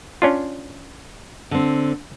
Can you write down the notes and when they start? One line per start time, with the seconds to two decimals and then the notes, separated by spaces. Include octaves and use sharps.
0.22 C#4 D4 F4
1.51 D3 C4